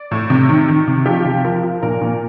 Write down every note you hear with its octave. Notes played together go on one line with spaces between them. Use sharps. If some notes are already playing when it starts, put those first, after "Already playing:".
Already playing: D5
A2
C3
D#3
D#3
C3
F3 G4
C3
F3 A#4
F3
A#2 A#4
A#2